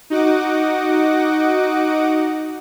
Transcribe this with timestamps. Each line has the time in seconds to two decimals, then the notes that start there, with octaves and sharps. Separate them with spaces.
0.10 D#4 F#4 D#5 F#5 D6